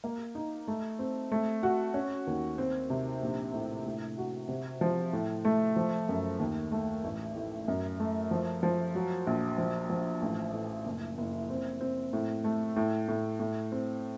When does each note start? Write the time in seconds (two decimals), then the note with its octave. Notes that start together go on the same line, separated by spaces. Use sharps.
0.04 A#3
0.35 D#4
0.68 A3
0.99 C4
1.32 A3
1.63 F#4
1.94 C#4
2.27 D#2
2.58 C4
2.90 C3
3.22 A#1
3.54 A2
3.86 A2
4.18 F#4
4.49 C3
4.81 F3
5.13 A2
5.45 A3
5.76 F3
6.09 F#2
6.39 D#2
6.72 A3
7.04 A1
7.35 A2
7.68 F#2
8.00 A3
8.31 F3
8.63 F3
8.95 F#3
9.27 A#1
9.58 F3
9.90 F3
10.22 A1
10.53 A2
10.86 F#1
11.18 F#1
11.50 C4
11.81 C4
12.13 A2
12.44 A3
12.76 A2
13.08 A2
13.40 A2
13.72 C4